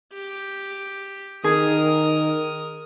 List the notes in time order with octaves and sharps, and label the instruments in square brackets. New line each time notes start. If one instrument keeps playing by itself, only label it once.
[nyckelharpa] G4
[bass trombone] D#3 [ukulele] G#4 [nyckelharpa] A#4 D#6